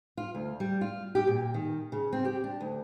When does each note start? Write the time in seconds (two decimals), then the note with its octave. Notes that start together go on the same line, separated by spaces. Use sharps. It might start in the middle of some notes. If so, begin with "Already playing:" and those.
0.17 F4
0.35 D2
0.60 G3
0.81 F4
1.15 G4
1.27 A#2
1.54 D#3
1.92 C#3
2.13 C4
2.25 G4
2.44 D4
2.61 D2